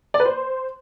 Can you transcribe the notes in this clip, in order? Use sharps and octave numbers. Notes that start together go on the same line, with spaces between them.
D5
B4
C5